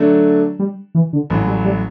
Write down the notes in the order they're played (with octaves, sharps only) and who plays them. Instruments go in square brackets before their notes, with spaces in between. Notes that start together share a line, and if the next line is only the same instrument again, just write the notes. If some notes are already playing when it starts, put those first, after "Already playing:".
Already playing: [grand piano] D3 F#3 A3 D4 A4
[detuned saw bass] G3
E3
D3
[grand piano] A1 A2 F#3 [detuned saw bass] E3
[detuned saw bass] G3
G3